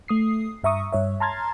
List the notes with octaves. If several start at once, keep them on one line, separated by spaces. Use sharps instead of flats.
A3 D#6 C7
G2 E5 A#5 C#6 D#6
G2 C#5 E5
A5 A#5 C6 F6 G#6 A6